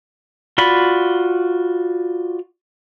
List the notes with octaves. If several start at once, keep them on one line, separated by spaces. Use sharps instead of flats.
F4 F#4 D5 B5